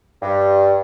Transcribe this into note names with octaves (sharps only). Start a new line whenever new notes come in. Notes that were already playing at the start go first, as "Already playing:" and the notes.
G2